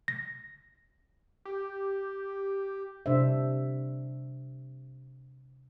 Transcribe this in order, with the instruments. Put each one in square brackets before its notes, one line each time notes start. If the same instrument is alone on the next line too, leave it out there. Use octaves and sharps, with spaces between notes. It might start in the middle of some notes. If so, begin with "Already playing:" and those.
[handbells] A#6
[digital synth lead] G4
[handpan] C3 D4 C5 E5